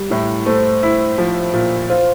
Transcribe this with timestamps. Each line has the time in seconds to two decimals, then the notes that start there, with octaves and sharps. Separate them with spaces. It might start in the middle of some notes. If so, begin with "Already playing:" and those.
Already playing: G3
0.10 A2 E4
0.46 A3 C5
0.83 E4
1.18 F3
1.53 A#2
1.89 F4 C5